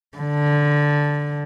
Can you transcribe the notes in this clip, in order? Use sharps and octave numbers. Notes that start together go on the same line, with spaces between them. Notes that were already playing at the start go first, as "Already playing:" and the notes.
D3